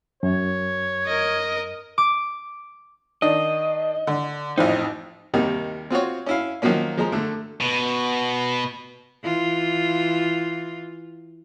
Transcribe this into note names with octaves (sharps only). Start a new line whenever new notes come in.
F#2 C#5
A#4 D#5
D6
D#3 D4 D#5
D3
A1 F2 C4 D#4
D#2 C3 D#3 G3
C4 F4 F#4 C#5
C#4 E4 F5
D#3 F3 F#3 A#3 C#4
F3 G#3 A#5
D3 A3
B2
E3 F4